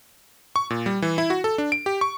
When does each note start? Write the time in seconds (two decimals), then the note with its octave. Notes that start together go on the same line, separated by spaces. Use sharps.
0.56 C#6
0.70 A#2
0.86 G3
1.02 E3
1.18 E4
1.30 F#4
1.44 A4
1.58 D4
1.72 D7
1.86 G4
2.01 C#6